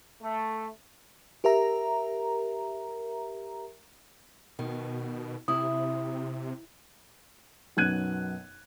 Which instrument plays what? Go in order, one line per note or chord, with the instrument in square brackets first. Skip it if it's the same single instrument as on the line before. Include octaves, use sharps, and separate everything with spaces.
[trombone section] A3
[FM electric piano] G4 A#4 E5 A#5
[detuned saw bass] B2 [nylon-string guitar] D#3
[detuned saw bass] C3 [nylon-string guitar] E4 [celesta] D#6
[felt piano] B1 F#2 B3 F#6 G#6 D#7